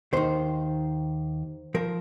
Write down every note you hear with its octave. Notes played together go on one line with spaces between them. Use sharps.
D#2 D#3 C5
F3 A#4